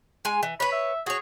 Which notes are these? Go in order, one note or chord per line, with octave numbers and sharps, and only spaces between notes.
G#3 G#5
E3
B4 C#5 B5
E5
F#4 G#4 C#5